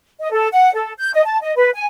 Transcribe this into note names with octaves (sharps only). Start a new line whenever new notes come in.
D#5
A4
F#5
A4
G6
D#5
A5
D#5
B4
G#5